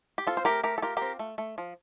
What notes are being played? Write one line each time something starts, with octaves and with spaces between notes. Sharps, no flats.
G4
C4 F4 A4
C5
A3 G4 A#4
A3 G4 A#4
A4
F4 G4 A#4
C4 G4 A#4
A3
A3
F3